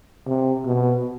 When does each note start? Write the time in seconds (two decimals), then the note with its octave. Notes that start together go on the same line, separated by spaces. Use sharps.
0.27 C3
0.65 B2